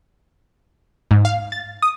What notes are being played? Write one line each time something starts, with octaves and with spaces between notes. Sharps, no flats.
G#2
F5
A6
D#6